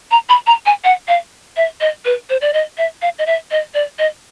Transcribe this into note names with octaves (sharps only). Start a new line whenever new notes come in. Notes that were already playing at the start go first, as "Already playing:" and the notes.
A#5
B5
A#5
G#5
F#5
F5
E5
D#5
B4
C5
D5
D#5
E5
F5
D#5
E5
D#5
D5
D#5